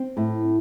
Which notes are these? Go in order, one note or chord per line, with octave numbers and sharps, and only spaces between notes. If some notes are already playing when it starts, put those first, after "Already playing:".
Already playing: C4
A2